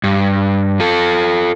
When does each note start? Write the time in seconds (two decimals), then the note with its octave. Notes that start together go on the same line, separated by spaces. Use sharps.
0.04 G2
0.80 F4 A4